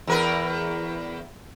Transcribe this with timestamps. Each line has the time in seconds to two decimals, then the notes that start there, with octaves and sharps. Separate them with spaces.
0.07 E2 A#4 B4